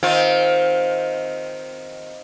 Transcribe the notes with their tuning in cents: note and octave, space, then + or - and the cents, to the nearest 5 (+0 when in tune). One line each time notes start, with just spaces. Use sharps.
D#3 +5 C4 +0 F4 +20